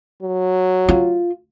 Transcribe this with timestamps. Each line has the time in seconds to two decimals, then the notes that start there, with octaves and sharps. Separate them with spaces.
0.22 F#3
0.89 F4